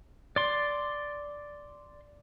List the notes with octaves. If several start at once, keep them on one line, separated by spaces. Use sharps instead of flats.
D5 C6